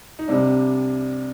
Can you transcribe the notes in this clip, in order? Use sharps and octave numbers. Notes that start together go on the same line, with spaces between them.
D#4
C2 C3 G3 D4